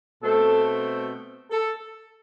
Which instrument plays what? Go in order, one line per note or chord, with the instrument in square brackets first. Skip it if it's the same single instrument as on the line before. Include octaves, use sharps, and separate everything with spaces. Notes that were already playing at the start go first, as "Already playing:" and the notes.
[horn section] B2 A3 C4 A4
A4